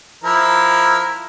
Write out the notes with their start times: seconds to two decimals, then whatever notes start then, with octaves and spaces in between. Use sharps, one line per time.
0.24 F3 E4 A#4